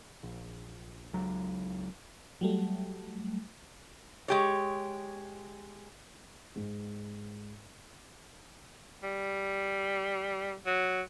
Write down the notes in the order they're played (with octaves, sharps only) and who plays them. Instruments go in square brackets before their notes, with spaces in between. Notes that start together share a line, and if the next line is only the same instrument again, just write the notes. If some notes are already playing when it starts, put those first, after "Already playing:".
[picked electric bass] A#1
C#2 F#3
[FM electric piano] F#3 G3 A3
[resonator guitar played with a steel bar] G#3 G4 C#5
[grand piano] G#2
[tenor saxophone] G3
F#3